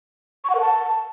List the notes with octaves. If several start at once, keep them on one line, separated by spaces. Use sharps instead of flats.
C#6
F#5
A#4
A5